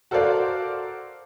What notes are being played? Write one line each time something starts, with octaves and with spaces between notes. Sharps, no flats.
F#4 A4 A#4 C5 D5 F5